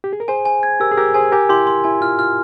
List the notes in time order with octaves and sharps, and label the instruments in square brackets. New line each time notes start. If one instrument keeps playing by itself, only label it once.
[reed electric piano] G4
G#4
A#4
[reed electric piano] G#4 C5 [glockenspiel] G#5
[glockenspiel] G#5
G#6
[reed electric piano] G4 A#4 [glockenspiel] E6
[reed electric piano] G#4
[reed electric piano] G4 A#4 [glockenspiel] E6
[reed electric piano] G#4 C5 [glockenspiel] G#5
[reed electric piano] G4 A#4 [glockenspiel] G#5
[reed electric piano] E4 G4 [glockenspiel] C6
[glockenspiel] C6
[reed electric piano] E4 [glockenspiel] G#5
[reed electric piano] F4 [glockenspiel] F6
[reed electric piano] F4 [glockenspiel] F6